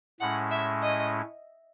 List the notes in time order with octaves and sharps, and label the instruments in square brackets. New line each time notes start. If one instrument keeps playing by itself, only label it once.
[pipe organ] A2 G#3 C#4 E4 [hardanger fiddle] F#5
[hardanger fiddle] E5
D#5